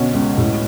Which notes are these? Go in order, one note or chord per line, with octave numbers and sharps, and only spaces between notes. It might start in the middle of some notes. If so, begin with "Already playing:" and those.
Already playing: B2 D3 C#4
C#2
A2